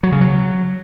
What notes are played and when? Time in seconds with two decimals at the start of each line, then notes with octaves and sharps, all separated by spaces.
0.03 F#3
0.12 C#3
0.21 F#3